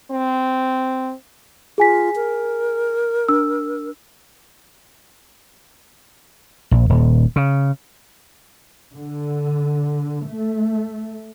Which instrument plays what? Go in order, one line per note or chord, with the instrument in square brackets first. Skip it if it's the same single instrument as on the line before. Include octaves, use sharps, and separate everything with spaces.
[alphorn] C4
[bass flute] F4 [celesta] G#4 G#5 B6
[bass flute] A#4
[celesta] D4 E6
[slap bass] A#1
D#1
C#3
[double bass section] D3
A3